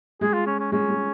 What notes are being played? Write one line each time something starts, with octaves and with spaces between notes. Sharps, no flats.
G#3 G#4
F4
C#4
C#4
G#3 C#4
G#3